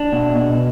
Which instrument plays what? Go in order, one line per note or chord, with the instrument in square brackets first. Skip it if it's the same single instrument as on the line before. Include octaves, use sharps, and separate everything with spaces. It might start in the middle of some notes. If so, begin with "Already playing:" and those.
Already playing: [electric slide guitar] D4
B2
B2